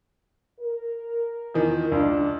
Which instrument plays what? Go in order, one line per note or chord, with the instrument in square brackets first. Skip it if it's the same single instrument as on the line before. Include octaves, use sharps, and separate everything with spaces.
[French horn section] A#4
[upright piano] E2 D#3 F3
[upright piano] C#2 [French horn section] D4